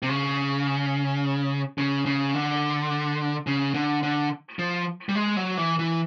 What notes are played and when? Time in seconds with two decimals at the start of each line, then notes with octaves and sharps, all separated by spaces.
0.03 C3
0.09 C#3
1.78 C#3
2.06 C#3
2.34 D3
3.47 C#3
3.74 D3
4.03 D3
4.59 F3
5.09 G3
5.15 G#3
5.37 F#3
5.57 E3
5.79 E3